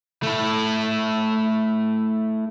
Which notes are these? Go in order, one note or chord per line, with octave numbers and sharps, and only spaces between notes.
A3 E4